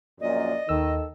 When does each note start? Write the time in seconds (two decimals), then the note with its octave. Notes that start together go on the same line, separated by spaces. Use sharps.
0.20 A#1 F#2 A#2 D5 D#5
0.69 D#2 D#3 A4 E6